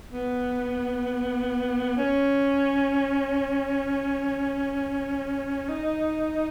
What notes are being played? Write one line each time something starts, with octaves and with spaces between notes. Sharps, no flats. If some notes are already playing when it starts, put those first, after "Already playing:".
B3
C#4
D#4